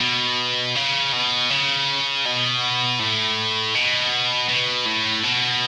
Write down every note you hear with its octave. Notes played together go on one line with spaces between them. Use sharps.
B2
C#3
B2
C#3
B2
A2
B2
B2
A2
B2